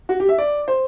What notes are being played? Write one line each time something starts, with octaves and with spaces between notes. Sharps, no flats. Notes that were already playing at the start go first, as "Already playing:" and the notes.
F#4
G4
E5
D5
C5